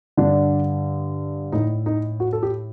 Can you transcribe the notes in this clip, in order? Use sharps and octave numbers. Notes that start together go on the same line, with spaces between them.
G2 D3 D4
A2 D#4
D#4
F#4
A4
G4